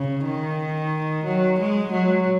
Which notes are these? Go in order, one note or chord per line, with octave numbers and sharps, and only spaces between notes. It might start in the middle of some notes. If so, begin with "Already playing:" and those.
Already playing: C#3
D#3
F#3
G#3
F#3